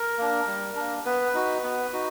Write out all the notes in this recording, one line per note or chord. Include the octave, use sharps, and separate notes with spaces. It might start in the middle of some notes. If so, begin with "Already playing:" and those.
Already playing: A#4
A#3 D4
G3
A#3 D4
B3 B4
D#4 F#4
B3
D#4 F#4